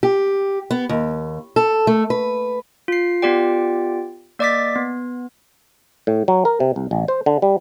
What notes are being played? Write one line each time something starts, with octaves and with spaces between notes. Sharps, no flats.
G4
B3
D#2
A4
A3
B4
F4 C7
B3 F4 G4 D5 G5
A#3 D5 D#5 D6 A6 B6
B3
A2
F#3
A#4
C3
C2
A1
C5
D3
G3